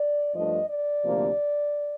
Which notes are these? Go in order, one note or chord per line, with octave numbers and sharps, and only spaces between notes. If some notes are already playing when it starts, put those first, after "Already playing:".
Already playing: D5
G2 F3 A3 D4 D#5
D5
D2 C3 F3 A#3